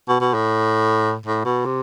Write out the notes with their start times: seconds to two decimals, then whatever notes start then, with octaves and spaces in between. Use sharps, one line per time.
0.09 B2
0.21 B2
0.34 A2
1.26 A2
1.45 B2
1.65 C3